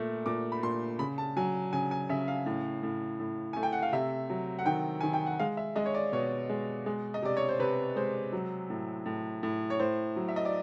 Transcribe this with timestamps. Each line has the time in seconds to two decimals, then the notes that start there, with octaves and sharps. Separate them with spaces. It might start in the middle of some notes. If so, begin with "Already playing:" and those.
Already playing: A#2 A3
0.26 A#2 D6
0.52 B5
0.63 A#2 C6
0.99 C#3 B5
1.18 A5
1.37 F#3 G#5
1.73 C#3 G#5
1.91 G#5
2.09 C#3 E5
2.28 F5
2.46 A2
2.83 A2
3.20 A2
3.53 A3 G#5
3.63 G5
3.72 F#5
3.83 F5
3.92 C3 E5
4.30 F#3
4.59 F#5
4.66 D#3 G5
5.01 D#3 G#5
5.13 G5
5.26 F#5
5.39 G#3 F5
5.57 E5
5.76 G#3 D#5
5.86 C#5
5.94 D5
6.13 B2 C#5
6.49 G#3
6.86 G#3
7.14 D#5
7.22 C3 D5
7.37 C#5
7.49 C5
7.59 C3 B4
7.96 G#3 C5
8.32 F#3
8.70 A2
9.06 A2
9.43 A2
9.70 C#5
9.80 A2 C5
10.16 F#3
10.29 E5
10.36 D#5
10.45 D5